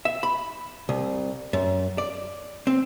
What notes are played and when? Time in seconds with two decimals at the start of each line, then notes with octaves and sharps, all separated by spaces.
0.05 E5
0.23 B5
0.89 C2
1.53 F#2
1.98 D5
2.67 C4